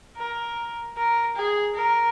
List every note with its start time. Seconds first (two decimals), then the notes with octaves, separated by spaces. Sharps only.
0.17 A#4
0.97 A#4
1.37 G#4
1.75 A#4